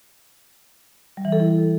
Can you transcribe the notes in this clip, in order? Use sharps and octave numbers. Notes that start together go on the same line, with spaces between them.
G3
E3
A4
E4